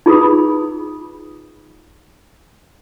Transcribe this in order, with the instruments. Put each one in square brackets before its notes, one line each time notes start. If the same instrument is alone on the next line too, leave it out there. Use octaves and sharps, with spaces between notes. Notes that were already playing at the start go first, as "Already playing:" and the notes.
[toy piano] D#4 F4 G#4 B4 B5 D#6